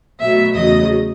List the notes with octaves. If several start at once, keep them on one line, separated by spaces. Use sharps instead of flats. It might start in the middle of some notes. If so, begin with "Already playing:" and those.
B2 F#3 A3 E5
E2 C#3 F#3 A3 D#5